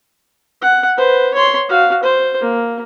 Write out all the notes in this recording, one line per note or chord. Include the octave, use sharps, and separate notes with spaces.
F#5
B4 C5
C#5 C6
F#4 F5
C5
A#3